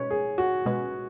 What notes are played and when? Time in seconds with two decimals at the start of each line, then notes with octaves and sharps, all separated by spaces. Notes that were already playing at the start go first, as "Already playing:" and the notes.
Already playing: B2 G#3 C#4 B4 C#5
0.11 G#4
0.38 F#4
0.66 B2 G#3 C#4 B4